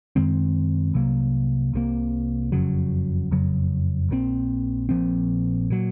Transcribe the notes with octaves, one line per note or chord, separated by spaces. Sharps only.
F#2 D#3 G#3 C4
C2 C3 F#3 A#3
C2 C3 F#3 A#3
F#1 F2 C#3 F#3
F#1 F2 C#3 F#3
A#1 A#2 F3 C4
A#1 A#2 F3 C4
A#2 F#3